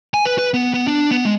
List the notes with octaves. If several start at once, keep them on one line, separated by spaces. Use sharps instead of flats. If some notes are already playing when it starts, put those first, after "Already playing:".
G#5
B4
B4
B3
B3
D4
B3
G#3